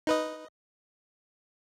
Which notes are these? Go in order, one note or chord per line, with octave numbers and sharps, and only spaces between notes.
D#4 B4 D#5